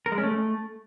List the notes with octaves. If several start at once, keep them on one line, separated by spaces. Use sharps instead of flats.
A#4
G#3
C#4
A3